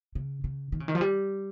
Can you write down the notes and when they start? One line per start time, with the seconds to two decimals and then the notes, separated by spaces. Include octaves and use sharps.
0.15 C#3
0.44 C#3
0.72 D#3
0.80 C#3
0.88 D#3
0.95 F3
1.01 G3